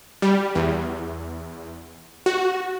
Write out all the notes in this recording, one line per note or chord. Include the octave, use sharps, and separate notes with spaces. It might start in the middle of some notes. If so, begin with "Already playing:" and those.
G3
E2
F#4